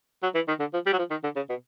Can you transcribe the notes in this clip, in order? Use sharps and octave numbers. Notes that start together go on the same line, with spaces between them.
F#3
E3
D#3
D3
F3
G3
F#3
F3
D#3
D3
C#3
B2